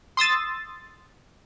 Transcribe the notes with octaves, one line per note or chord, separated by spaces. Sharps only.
C6 D#6 E6 A6